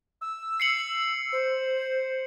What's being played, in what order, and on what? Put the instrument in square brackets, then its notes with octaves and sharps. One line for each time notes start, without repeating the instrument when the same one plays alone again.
[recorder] E6
[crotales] C7 C#7 F#7
[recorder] C5